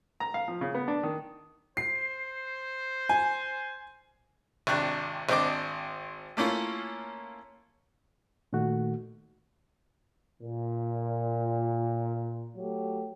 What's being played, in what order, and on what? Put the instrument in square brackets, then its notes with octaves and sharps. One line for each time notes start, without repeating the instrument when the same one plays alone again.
[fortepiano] A#5
F5
F3
C#3
B3
D4
D#3
[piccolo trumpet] C5 [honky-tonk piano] C7
[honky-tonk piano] G#5
[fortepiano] G#1 C3 D4 C#6 F#6
G#1 C4 D4 D#5 C6 D6
A3 A#3 C#4 E4 F4
[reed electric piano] A#2 D#3 A3 F#4
[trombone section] A#2
F#3 A3 G4